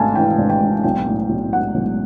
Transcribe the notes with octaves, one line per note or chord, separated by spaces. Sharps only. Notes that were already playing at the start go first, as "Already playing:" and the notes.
Already playing: G#1 G#2 A3 F5 G#5 A5
E3 G5
G#1
G5
G#2
B1 G5
A2
B1
F#3 F#5
B1